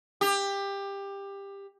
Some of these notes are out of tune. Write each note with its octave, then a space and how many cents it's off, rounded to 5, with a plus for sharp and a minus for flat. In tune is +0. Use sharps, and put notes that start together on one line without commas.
G4 +20